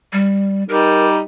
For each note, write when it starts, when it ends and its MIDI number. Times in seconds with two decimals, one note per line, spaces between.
0.13 0.64 55
0.69 1.21 55
0.69 1.21 63
0.69 1.05 70